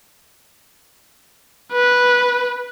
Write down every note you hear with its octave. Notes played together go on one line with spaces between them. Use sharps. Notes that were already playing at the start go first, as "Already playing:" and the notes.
B4